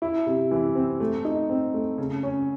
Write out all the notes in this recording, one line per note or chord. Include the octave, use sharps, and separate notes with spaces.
E4
C3
E3
C4
A3
D#4
C4
A3
C#3
C#4